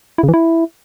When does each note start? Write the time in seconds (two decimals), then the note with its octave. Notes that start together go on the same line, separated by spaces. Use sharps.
0.18 E4
0.23 C#3
0.28 E3
0.34 E4